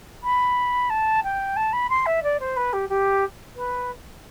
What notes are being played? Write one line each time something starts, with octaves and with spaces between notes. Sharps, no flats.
B5
A5
G5
A5
B5
C6
E5
D5
C5
B4
G4
G4
B4